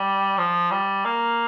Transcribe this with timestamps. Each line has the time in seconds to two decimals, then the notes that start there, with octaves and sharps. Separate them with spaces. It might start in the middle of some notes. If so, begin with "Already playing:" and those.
Already playing: G3
0.38 F3
0.71 G3
1.05 A#3